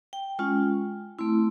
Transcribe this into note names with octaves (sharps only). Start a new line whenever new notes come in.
G5
G#3 C#4 F4
A3 C4 E4